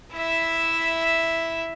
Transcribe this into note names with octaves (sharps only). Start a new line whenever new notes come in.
E4 E5